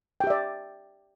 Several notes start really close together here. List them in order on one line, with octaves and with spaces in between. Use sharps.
G5 G4 E5 D5